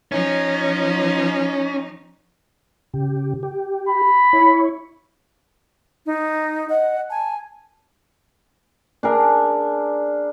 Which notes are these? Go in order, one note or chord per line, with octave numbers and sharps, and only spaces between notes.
F3 C#4 D#4
C#3 G4
G4
B5
E4 C#5
D#4
D#5 F#5
G#5 A5
D4 G#4 A#4